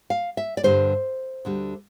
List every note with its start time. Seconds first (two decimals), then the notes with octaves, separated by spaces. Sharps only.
0.10 F5
0.37 E5
0.57 D5
0.63 G2 D3 G3 C5
1.45 D2 D3 G3